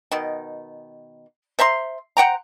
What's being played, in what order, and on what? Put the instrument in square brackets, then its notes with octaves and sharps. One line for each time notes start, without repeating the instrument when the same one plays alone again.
[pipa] B2 D#3
C5 E5 A#5 C6
C5 F#5 G5 A#5